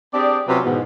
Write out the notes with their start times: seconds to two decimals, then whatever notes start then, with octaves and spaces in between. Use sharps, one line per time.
0.14 C4 D4 G4 G#4 D5
0.48 C3 F#3 C#4 F4 G4 B4
0.65 E2 G#2 B2